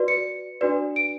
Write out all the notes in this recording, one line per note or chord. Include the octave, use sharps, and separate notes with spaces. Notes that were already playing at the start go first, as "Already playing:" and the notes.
Already playing: F#4 B4 D5
C#7
D4 F#4 B4 D5
D7